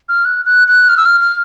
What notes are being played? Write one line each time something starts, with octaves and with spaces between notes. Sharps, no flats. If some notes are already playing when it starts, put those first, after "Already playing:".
F6
F#6
F#6
F#6
F6
E6
F6
F6